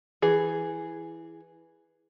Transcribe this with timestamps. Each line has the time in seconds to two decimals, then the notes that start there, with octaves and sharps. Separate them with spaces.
0.22 E3 G#4